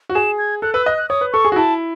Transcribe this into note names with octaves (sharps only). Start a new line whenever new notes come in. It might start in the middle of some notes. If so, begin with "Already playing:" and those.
F#4
G#4 E7
G#6
A4 F#6
B4 E6
D#5 F#6
F#6
C#5 D#6
B4
A4 C#6
G#4
F#4
E4 A5